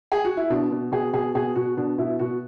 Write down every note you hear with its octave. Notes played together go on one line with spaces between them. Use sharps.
G#4
F#4
E4
B2 D4
B2
B2 G#4
B2 G#4
B2 G#4
B2 F#4
B2 D4
B2 E4
B2 F#4